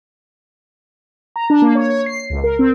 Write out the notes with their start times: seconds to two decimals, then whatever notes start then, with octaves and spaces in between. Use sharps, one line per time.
1.36 A#5
1.50 D4
1.62 A#3
1.75 C#5
1.90 C#5
2.06 C7
2.30 C#2
2.44 A#4
2.59 C4